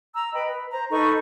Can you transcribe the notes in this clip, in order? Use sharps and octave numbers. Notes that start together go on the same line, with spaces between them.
A#5 E6
B4 D#5 G5 B5
B4
C5 A#5
D#4 A4 B4 C#6